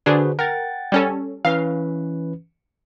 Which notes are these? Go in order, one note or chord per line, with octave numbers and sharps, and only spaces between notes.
D3 D4 F#4 G#4 B4 C5
A#4 F#5 G5 A6
G3 C#4 A4
E3 C#4 B4 F5